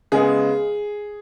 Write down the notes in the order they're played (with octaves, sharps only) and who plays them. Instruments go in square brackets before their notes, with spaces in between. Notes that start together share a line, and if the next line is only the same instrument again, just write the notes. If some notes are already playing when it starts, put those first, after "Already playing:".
[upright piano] C#3 G#3 B3 G#4